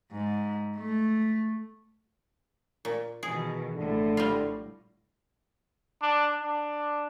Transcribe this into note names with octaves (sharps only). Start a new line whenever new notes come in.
G#2
A3
A#2
B2 D#3 E3 G#4
A#1 A2 D3
G3 F4
D4
D4